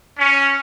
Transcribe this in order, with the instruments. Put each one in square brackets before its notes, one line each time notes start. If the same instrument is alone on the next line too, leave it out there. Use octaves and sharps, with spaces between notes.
[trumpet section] C#4